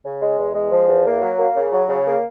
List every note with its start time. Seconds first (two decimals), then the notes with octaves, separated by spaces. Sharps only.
0.04 C#3
0.21 G#3
0.37 E2
0.54 G#3
0.70 F3
0.88 E2
1.05 A#3
1.21 F#3
1.38 A#3
1.55 C#3
1.71 F#3
1.88 C#3
2.06 A#3